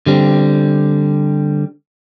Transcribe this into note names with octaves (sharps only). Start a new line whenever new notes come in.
D3 G3 C4